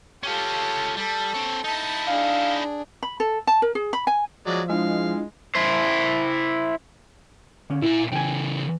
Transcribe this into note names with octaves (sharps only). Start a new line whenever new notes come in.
C#4 F4 G4 A4
G3 A4
C4 C#5
D#4 E4 A5
D4 G#4 F5
B5
A4
A5
A#4
G#4
B5
G#5
F3 F#3 G#3 D5
G#3 D4 E4 F4 F5
E4 C5
D3 C#4
A#2 E4 G#5
C#3 E3 G5 G#5